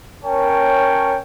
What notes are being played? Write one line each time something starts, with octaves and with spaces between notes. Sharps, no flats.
C#4 A#4 C#5 G5 A5